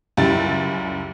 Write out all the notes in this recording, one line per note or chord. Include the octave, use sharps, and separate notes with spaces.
C#2 F#2 G3 E4 A6